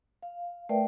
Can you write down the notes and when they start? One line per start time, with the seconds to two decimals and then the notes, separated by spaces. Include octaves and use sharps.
0.23 F5
0.69 A3 A#4 B4 D5 E5 G5